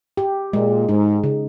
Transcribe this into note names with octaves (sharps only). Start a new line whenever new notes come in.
G4
A#2 G#3
G#2 D#4
C#3